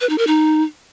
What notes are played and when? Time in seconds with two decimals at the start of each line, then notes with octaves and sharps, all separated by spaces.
0.01 B4
0.09 D#4
0.18 A#4
0.27 D#4